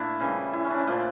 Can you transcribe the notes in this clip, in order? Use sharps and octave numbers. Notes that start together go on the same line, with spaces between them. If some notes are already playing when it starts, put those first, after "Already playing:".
Already playing: A#2 A3 D4 E4
C#3 E3 G3
E4
C#4
D4
E4
A#2 F3 A3 D4